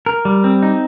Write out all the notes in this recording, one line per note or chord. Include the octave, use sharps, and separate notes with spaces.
A#4
G3
C4
D#4